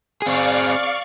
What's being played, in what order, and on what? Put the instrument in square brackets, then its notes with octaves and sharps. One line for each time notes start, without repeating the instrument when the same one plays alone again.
[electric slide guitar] C4 G#4 [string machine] D5 F5 C#6